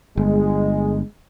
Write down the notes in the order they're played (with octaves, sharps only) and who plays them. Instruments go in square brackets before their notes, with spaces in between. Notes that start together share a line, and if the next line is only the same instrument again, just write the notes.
[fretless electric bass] G1 [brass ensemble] G#3